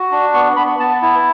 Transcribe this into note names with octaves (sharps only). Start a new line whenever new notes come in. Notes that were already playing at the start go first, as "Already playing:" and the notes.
Already playing: F#4
D4
B3 C#6
B3 B5
B3 A5
E4